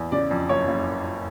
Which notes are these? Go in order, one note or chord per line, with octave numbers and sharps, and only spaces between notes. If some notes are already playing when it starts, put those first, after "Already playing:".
Already playing: E2
C#3 D5
F2
F#1 C#5
F#1